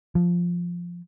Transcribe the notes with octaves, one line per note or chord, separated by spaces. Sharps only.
F3